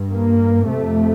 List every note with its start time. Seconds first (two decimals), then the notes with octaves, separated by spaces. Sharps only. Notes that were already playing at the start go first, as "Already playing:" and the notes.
Already playing: G2
0.12 A#3
0.70 F2 C3 A3